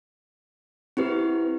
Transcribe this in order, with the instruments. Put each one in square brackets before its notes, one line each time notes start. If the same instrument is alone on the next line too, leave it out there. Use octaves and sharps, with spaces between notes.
[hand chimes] C4 E4 G4 B4